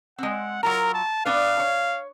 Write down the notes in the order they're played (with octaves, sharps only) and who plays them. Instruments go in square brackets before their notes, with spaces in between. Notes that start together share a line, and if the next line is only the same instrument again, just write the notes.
[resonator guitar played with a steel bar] G#3 C4 [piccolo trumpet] F#5
[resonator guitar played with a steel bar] F#3 F4 A#5 [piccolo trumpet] A#4
[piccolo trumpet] A5
[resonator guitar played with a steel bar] B3 D4 B4 [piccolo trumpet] F5
[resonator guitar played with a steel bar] C#5